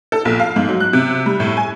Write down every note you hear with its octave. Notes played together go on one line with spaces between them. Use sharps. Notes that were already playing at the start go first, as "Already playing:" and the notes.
A4
A#1
F5
G#2
F#3
F#6
C3
G3
A2
G#5